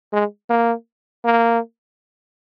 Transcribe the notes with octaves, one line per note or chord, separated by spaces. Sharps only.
G#3
A#3
A#3